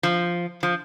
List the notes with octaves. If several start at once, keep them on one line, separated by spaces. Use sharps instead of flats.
F3
F3